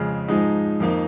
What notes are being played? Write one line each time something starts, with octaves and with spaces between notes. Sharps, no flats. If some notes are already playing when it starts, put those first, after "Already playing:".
Already playing: F2 C#3 G#3
G#2 F3 G#3 D#4
F2 F3 A#3 D#4